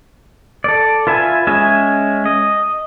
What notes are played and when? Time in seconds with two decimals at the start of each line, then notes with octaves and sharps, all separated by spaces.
0.64 A4 D5
1.07 F4 B4 E5 G#5
1.47 G#3 C#4 E5 G#5
2.26 D#5